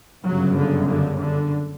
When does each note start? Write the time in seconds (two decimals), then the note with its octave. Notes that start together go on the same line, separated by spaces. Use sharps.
0.24 G1 F#2 C#3 F#3
0.57 D3
0.88 D3
1.19 D3